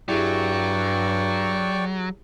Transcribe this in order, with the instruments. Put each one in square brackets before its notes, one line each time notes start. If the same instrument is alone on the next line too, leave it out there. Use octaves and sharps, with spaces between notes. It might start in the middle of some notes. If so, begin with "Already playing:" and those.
[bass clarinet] G2 [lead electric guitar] F#3 [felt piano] E4 G4 G#4 [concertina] D5 G5 C#6